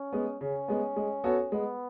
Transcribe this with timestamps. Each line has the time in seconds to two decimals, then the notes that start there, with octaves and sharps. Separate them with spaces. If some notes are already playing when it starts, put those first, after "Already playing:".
Already playing: C#4
0.13 G#3 B3
0.41 C#3 C#4
0.68 G#3 B3
0.96 G#3
1.24 B3 F#4 A4 C#5
1.52 G#3 B3